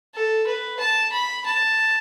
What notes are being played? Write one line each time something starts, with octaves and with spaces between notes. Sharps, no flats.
A4
B4
A5
B5
A5